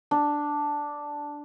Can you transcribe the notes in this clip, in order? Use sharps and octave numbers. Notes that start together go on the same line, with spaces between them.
D4